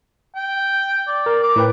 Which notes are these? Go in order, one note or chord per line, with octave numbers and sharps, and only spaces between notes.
G5
D5
A#4
D6
A2 B4 G5